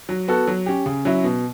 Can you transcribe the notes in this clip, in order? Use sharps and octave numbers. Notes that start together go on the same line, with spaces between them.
F#3
B3 F#4 A4
F#3
C#4 G4
C#3
F#3 C#4 E4
B2